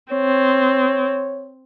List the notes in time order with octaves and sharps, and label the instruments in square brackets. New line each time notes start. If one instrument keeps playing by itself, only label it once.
[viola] C4 [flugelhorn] C#5